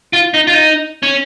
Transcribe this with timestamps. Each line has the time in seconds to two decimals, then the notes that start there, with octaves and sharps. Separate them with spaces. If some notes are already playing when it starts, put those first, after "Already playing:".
0.13 F4
0.34 D#4
0.47 F4
0.54 D#4
1.03 C#4